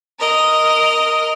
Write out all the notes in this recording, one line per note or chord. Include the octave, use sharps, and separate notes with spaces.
A#4 D#5